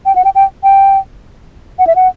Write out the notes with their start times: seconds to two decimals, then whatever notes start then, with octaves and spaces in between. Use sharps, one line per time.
0.06 G5
0.16 F#5
0.25 G5
0.35 G5
0.63 G5
1.79 F#5
1.87 E5
1.96 F#5